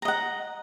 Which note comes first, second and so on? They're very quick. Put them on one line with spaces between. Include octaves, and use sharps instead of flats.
A#5 D#5 F#5